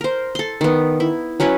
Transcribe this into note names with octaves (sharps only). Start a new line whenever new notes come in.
A#4 C5
A4 C6
D#3 B3
E4
F#3 C#4 E4 B4